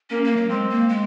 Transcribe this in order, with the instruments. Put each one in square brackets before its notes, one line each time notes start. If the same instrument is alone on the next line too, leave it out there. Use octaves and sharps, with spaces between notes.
[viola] A#3 [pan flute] C#4
[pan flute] A#3
F#3
[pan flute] G#3 [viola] C4
[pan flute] A#3
G#3